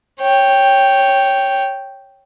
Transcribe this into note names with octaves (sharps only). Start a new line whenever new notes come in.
C#5 G5